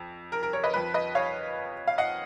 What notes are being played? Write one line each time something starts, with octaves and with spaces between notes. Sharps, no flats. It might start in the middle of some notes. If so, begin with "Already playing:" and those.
Already playing: F2
A#4
A#4
A#4 C#5
B4 D#5
F2 F3 B4
B4 D#5
C#5 F5
F5
D#5 F#5